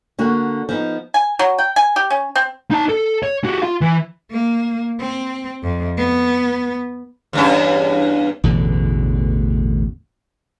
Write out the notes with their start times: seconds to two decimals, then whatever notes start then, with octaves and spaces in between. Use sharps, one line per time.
0.19 D3 A#3 F#4
0.69 F3 B3 D#4
1.14 G#5
1.39 F#3
1.58 G5
1.76 G#5
1.96 G4
2.10 C#4
2.36 C4
2.71 D#4 A5
2.89 A4
3.23 C#5
3.44 F#4 G4
3.62 F4 F5
3.81 E3
4.31 A#3
4.99 C4
5.63 F2
5.97 B3
7.33 E2 G2 C#4
8.44 A1 E2 B2 D3